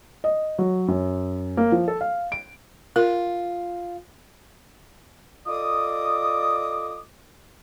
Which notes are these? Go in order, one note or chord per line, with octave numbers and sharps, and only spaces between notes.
D#5
F#3
F#2
A#3
F3
A4
F5
D7
F4 A#4
F4 A4 D5 D#5 D6 D#6